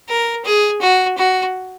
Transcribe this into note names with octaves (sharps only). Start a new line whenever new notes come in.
A#4
G#4
F#4
F#4